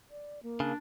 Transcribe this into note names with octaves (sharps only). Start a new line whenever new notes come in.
D5
A#3
C#3 D4